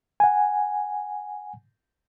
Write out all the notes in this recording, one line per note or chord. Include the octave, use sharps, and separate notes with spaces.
F#5 G#5